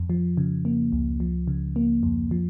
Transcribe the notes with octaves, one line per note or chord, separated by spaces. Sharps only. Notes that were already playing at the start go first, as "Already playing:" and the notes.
Already playing: F2
F3
C#3
A#3
C#2
F3
C#3
A#3
F2
F3